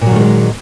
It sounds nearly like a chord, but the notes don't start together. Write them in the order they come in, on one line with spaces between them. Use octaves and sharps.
A#2 F#3 D#3 A3 G#3